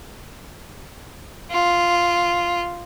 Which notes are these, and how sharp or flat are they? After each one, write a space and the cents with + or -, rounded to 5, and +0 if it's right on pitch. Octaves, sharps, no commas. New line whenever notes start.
F4 -5